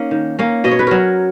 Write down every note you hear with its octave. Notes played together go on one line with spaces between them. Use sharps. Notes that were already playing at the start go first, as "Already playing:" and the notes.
Already playing: A#3 C#4 D#4
D#3
A#3 C#4
B2 D#5
C#5
B4
F#3 C#4 A#4 C#5